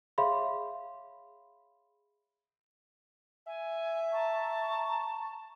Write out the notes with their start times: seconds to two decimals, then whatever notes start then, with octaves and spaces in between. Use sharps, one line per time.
0.18 G#4 C#5 E5 F5 B5 C6
3.47 E5 G#5
4.12 A5 A#5 C#6